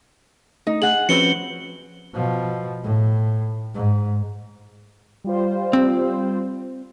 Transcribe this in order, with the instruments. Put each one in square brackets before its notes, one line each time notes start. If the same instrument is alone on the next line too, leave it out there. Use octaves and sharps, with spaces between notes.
[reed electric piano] A3 D#5 [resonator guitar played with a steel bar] D#4
[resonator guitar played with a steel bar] G#4 F#5 [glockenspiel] F#7
[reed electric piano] F3 C#4 B4 [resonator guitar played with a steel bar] C4 F#4 [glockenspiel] C#7 G7
[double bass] B2 F3
A2
G#2
[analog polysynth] G3 F4 C5
[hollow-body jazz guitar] C4